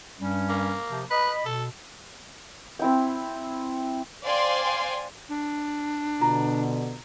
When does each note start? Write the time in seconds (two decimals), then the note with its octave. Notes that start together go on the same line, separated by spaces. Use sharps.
0.19 G2 G3 C#4
0.49 A#3
0.90 C3 F3
1.10 B4 D#5 B5
1.46 B2 A4
2.79 C4 E4 G5
4.22 C5 D5 F5 G5 G#5 C6
5.29 D4
6.21 B2 D3 F4 A#5